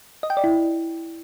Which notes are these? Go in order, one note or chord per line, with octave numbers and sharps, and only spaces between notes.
D#5
G5
D5
E4